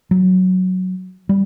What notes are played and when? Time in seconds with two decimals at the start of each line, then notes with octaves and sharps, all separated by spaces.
0.11 F#3
1.29 G3